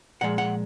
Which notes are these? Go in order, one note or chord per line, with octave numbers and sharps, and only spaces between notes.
A#2 F3 G#3 F#5
F#5